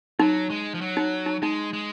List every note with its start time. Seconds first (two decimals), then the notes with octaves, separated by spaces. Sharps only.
0.19 F#3 D#4
0.50 G#3
0.75 F3
0.81 F#3
0.97 D#4
1.26 D#4
1.42 G#3 D#4
1.73 G#3